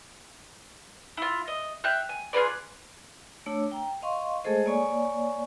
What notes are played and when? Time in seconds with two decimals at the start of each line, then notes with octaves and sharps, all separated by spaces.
1.17 E4 F4
1.48 D#5
1.84 E5 F5 G5 F#6
2.09 G#5
2.33 F4 G#4 B4 D5
3.46 A3 D4 C#5 E6
3.72 G5 A#5
4.02 D#5 F5 C6 C#6
4.44 G#3 A3 G#4 A4 C5 D#5
4.66 A#3 C#5 D5 G#5 C#6